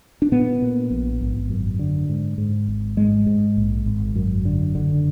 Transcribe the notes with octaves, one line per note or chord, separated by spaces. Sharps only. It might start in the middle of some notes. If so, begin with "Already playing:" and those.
D4
A#2 B3
A#2
A#1
G#1
F#2
D3
G#2
G#2
G#1
G#2 G#3
G#2
A#1
G#1
F#2
D3
F#1 D3